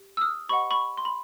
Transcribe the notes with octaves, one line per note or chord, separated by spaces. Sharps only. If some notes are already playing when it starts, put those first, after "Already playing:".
Already playing: G4
E6
D#6 F6
G4 C5 D#5 F#5 B5 C#6
B5 C#6
C6
B5